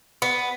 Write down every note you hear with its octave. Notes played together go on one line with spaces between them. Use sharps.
B3